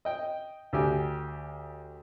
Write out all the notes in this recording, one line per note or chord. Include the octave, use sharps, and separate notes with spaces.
D#5 G5
D2 G4 G#5